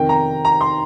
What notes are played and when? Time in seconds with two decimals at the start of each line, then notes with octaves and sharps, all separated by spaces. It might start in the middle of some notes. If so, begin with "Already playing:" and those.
Already playing: F2 C3 D#3 G5
0.09 A#5
0.45 A#5
0.61 C6